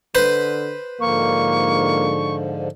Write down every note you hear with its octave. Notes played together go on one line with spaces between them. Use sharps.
D3 B4 C5
G#2 D3 F3 A#3 C#6